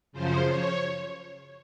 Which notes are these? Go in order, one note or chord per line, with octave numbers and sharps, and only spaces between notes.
F#2 C#3 F3 C5
C#5